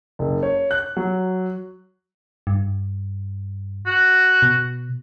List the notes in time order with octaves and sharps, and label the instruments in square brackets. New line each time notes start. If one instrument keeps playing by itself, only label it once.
[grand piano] F#1
C#5
F#6
F#3
[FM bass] G2
[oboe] F#4
[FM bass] B2